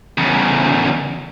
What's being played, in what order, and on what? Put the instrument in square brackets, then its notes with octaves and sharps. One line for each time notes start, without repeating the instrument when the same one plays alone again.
[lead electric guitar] E2 C#3